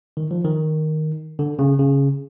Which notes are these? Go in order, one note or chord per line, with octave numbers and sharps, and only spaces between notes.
D#3
F3
D#3
D3
C#3
C#3